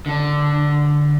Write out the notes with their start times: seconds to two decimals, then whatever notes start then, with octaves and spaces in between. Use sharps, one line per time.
0.06 D3 D4